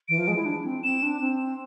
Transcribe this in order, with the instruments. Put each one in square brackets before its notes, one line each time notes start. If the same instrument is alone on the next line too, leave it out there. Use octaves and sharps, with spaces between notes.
[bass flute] E3 [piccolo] D7
[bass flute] F3
G#3
E4
D4
C4
[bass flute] C4 [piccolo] E7
[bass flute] D4
C4